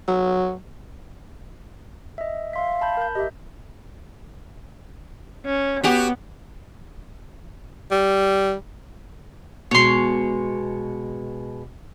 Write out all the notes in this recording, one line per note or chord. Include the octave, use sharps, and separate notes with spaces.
F#3
D#5 E5
E5 F5 C6 B6
A5 B5 G6
A#4 G6
G4 D#5 E5
C#4
B3 F#4 G4
G3
B2 G#3 C#5 C6